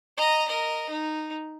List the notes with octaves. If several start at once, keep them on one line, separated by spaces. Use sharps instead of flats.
D#5 A#5
A#4 D#5
D#4